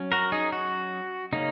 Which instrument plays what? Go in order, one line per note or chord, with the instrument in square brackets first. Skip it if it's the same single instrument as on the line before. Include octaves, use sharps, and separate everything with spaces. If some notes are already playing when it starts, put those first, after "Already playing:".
Already playing: [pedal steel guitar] F#3 C#4
F#4 A#4
D#4 G#4
F#4
C#3 A#3 C#4 D#4